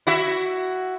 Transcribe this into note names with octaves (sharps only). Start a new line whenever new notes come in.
E4 F#4 E5